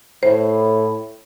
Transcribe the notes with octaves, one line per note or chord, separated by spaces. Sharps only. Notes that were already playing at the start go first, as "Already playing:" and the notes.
A2 C5